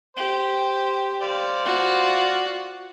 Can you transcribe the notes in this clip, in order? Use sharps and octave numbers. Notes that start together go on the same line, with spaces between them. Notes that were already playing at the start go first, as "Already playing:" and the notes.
G4 C5
C5 D5 F5
F4 F#4